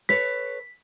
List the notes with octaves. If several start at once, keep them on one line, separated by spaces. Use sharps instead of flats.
A4 B4 C#5 B6